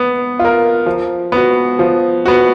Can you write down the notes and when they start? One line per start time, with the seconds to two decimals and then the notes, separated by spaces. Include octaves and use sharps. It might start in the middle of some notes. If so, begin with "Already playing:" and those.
Already playing: B3
0.39 F4
0.45 A#4
0.86 F3
1.32 B3 F#4
1.79 F3
2.25 B3 F#4